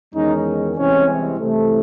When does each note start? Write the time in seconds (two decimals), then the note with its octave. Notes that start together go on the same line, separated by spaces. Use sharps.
0.14 E2 D#3 G#3 C#4 D#4
0.77 C2 C3 E3 G#3 C4 C#4
1.40 C2 C3 E3 A3